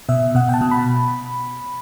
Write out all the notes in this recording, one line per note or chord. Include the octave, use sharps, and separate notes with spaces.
B2 E5
B2 F#5
G5
A5
B2
B5